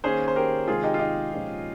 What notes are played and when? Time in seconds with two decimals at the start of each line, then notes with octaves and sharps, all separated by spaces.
0.04 D#3 A#3 C#4 G#4 C5
0.28 C5
0.36 G4 A#4
0.68 C3 D#3 G#3 F4 G#4
0.83 D#4 G4
0.94 F4
0.99 D#4 G4
1.31 A#2 F3 G#3 C#4